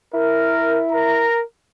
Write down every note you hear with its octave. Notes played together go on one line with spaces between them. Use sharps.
E4 A#4
A#4 A#5